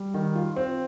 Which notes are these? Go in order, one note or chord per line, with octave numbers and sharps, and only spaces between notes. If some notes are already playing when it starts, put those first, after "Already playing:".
Already playing: G3
D#3
F4
C4